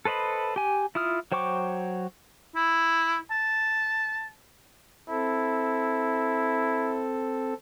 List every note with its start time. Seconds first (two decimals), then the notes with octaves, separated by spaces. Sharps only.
0.05 A4 B4 C5 D#5 B5
0.56 G4 G#5
0.95 E4 F4 D#6 F6
1.32 F#3 C5 G5 C#6 D6
2.56 E4
3.31 A5
5.09 C4 E4 A4